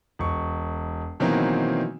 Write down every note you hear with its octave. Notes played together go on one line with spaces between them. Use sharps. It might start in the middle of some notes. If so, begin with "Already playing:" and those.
E1 C#6
B2 D#3 E3 F#3 A#3 C4